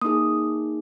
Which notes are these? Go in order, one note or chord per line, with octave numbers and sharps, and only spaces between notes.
A#3 D#4 G#4 D#6